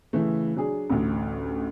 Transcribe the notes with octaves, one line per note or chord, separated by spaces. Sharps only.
C#3 E3 A3
F#3 D4 G#4
A1 D2